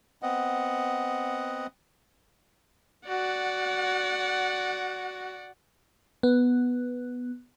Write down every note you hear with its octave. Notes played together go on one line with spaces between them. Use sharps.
B3 C4 D#5 F#5
F#4 D5 F#5
B3